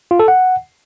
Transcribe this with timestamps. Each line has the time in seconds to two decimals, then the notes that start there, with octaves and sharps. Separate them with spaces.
0.11 F4
0.20 A4
0.28 F#5